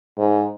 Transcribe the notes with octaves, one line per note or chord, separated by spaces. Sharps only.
G#2